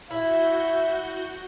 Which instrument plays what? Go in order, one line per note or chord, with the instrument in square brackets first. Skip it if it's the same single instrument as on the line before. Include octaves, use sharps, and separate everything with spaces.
[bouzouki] E4 [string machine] F#4 G6 [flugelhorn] E5